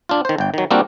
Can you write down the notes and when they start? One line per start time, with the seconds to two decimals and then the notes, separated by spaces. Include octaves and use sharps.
0.09 D4 F4
0.25 D#3 C5
0.38 G1 G5
0.54 D#3 F#3
0.71 G3 A#3 C4 D4 F4 F#4